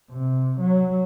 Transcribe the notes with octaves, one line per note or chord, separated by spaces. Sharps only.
C3
F#3